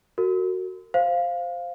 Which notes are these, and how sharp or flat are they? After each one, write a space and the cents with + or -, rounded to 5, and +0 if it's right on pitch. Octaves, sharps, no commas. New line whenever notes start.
F#4 +0 A#4 -35
C5 +0 F5 +0